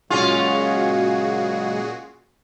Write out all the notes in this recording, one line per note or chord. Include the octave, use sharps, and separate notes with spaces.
A#2 C#3 F#3 G#3 C#4 F4 F#4 G#4